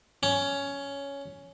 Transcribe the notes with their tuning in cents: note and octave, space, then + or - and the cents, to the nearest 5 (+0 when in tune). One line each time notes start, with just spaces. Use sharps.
C#4 +10